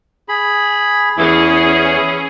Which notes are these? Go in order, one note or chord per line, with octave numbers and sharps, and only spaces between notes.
G#4 B5
E2 E3 C#4 E4 G#4